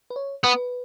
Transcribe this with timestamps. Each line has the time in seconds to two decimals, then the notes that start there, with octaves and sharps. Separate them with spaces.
0.10 B4
0.16 C#5
0.44 B3 B4